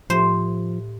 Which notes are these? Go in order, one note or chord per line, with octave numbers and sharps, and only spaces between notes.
A2 F3 G4 C5 E5